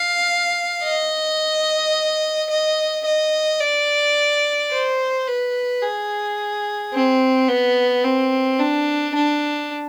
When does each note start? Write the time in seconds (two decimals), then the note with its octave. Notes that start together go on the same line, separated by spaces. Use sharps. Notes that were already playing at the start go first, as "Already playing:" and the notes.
Already playing: F5
0.83 D#5
2.50 D#5
3.05 D#5
3.60 D5
4.71 C5
5.27 B4
5.82 G#4
6.93 C4
7.49 B3
8.04 C4
8.59 D4
9.15 D4